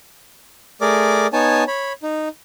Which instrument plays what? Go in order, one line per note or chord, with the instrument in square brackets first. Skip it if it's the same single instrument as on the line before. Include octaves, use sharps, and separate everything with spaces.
[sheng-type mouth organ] A3 G#4 A#4 D5 D6
B3 D#4 C#5 G#5 A5
C#5 B5
D#4